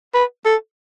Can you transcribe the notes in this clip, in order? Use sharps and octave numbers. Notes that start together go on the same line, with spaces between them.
B4
A4